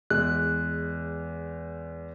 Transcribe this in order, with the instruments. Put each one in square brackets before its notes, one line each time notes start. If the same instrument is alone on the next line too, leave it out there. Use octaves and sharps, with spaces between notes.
[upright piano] E2 G#3 [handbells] F#6